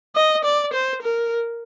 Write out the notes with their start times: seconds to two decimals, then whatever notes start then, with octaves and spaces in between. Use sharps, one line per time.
0.16 D#5
0.45 D5
0.73 C5
1.02 A#4